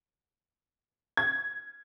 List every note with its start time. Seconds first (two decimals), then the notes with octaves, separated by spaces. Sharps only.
1.17 G#6